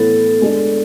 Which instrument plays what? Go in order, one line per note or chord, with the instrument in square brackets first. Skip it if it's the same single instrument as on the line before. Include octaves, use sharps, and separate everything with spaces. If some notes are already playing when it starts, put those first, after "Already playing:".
Already playing: [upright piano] A2 E3 B3 E4 [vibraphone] A4
[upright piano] G#3 B3 D4 A4 D5